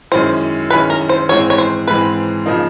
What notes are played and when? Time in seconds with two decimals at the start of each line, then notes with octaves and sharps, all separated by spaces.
0.12 F#2 D#3 G#3 C#4 E4 C5
0.70 F#2 D#3 G#3 C#4 E4 B4
0.90 A#4
1.09 C5
1.29 G#2 E3 G#3 C4 C#5
1.50 C#5
1.58 C5
1.87 G#2 E3 G#3 C4 B4
2.46 C#3 F3 A#3 D#4